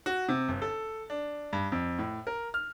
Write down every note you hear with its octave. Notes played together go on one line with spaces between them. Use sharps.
F#4
C3
G1
A4
D4
G2
F2
A2
A#4
F6